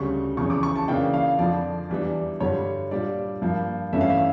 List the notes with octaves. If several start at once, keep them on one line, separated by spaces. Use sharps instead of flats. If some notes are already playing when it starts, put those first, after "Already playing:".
Already playing: D2 C#3 G3 C#6
E2 C#3 F3 C#6
D6
C#6
A5
C#3 E3 A#3 D4 G5
F5
F2 D3 F3 D5
E2 E3 G3 D4
G2 D3 G3 C#5
A#2 G3 D4 D5
G2 F3 A#3
G2 E3 A3 C#4 E5
F5
E5